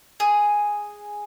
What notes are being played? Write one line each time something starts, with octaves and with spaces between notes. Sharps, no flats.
G#4